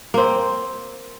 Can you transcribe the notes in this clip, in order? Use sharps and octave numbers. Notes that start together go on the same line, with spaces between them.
A#3 C4